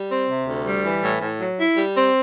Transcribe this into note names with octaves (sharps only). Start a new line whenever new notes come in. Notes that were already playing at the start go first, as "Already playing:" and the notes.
Already playing: G3
C4
C3
D2
G3
E3
A2
A2
F#3
E4
G3
C4